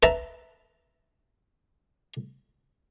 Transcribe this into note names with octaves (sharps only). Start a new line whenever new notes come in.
B4 E5 A5 A#5